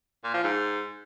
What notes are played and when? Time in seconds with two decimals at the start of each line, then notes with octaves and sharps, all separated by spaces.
0.24 A#2
0.34 F3
0.44 G#2